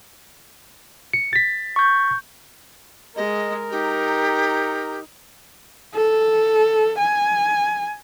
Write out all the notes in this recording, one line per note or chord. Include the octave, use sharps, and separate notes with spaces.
C#7
A6 B6
C#6 G6
G#3 A#4 D#5
D#4 G4
A4
G#5